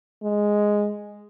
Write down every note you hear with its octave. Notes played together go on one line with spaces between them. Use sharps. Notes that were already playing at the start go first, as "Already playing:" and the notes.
G#3